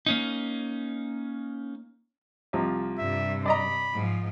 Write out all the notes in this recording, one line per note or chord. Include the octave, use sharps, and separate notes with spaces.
A#3 C#4 D#4
C2 F3
G2 C3 E5
D5 D#5 A#5 B5
G#2 F3